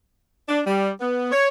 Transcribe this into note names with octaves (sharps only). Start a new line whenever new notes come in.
D4
G3
B3
C#5